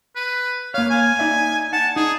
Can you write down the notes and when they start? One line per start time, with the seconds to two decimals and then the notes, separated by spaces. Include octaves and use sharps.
0.16 B4
0.74 A#3 C#5 F5
0.90 G#5
1.19 D#4 D5 E5
1.73 F#5 A5
1.96 D#4 G#4